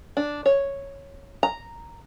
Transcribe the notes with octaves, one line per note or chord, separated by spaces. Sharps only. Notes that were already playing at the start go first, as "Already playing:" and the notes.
D4
C#5
A#5